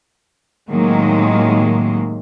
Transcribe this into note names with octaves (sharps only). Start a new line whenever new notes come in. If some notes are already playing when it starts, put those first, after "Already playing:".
A2 C3 D#3 F#3 G#3 A#3